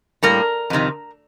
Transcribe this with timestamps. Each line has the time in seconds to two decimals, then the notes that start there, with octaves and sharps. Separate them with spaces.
0.23 A2 G3 A#3 A#4
0.70 F2 C3 D#3